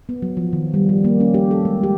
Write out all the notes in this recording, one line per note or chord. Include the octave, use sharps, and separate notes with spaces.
B3
F#3
F3
D#3
G3
G3
A#3
C#4
G4
A4
G#3
G4